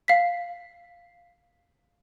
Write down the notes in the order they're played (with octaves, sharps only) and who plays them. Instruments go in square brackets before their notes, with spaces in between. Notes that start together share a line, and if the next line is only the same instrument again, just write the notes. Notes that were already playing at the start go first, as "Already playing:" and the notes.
[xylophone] F5 B6